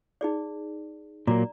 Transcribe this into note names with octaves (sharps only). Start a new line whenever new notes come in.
D#4 G#4 D5
A#2 F#3 A#3 D5 A#5